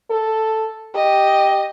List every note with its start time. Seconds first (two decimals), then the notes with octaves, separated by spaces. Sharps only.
0.10 A4
0.95 G4 D#5